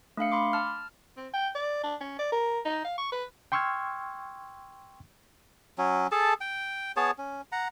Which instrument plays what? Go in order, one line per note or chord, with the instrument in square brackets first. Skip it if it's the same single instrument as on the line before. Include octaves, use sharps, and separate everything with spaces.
[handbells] A3 D4 F5 C#7
B5 C6 D6
A5 F6
[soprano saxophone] C4
G5
D5
D4
C#4
D5
A#4
D#4
F5
C#6
B4
[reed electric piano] G5 C6 C#6 E6 F6 G#6
[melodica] F#3 C#4
G#4 A4 A5
G5
B3 G#4 C#5 A5
C#4
F#5 A#5